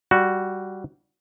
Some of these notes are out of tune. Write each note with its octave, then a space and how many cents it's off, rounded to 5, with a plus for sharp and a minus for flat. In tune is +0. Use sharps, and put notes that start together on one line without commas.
G3 -10 F#4 +0